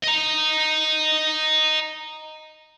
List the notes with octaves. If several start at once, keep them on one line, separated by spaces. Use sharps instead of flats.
D#5 A#5